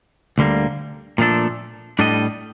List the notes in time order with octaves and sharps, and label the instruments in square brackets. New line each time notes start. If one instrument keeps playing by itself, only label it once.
[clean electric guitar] D2 D3 G3 A#3
A#2 F3 A3 D4 A4
A2 G3 D4 A4 D#5